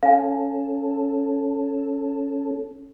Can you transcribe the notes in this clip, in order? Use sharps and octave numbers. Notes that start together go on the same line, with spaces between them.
C#4 A4 F5 G#5